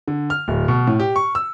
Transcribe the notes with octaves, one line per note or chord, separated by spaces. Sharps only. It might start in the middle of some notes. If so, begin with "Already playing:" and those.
D3
F6
D1
B2
A2
G4
C#6
E6